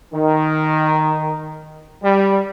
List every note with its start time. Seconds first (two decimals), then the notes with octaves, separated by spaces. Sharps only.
0.14 D#3
2.02 G3